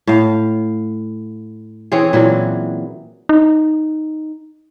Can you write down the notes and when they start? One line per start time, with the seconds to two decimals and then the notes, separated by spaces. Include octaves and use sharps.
0.07 A2 F5
1.92 E3 C4 C#4 G#4
2.13 A#2 E3 F#3
3.29 D#4